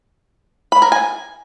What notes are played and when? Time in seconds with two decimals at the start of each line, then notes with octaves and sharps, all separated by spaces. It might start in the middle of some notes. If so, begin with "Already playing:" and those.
0.72 B5
0.82 A#4
0.92 G#5